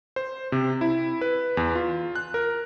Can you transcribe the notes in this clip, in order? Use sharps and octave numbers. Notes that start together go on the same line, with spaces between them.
C5
C3
E4
B4
E2
F4
F#6
A#4